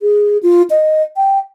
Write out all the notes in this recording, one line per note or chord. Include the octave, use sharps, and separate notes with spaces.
G#4
F4
D#5
G5